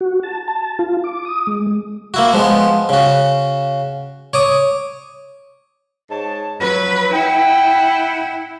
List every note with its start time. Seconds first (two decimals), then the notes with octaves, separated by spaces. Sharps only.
0.01 F#4
0.23 A5
0.48 A5
0.79 F4
1.04 D6
1.25 D#6
1.47 G#3
2.14 A#3 E4 F#4
2.33 F3 G#3 B3
2.89 C#3 F#4
4.33 C#5 D6 D#6
6.10 G#2 C#5 A5
6.61 F3 F#3 B4
7.13 E4 F#5 G5